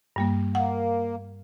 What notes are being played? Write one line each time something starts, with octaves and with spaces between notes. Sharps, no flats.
G2 G3 A#3
A#3 F#5